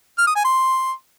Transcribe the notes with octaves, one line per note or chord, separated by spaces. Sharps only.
F6
D#6
G#5
C6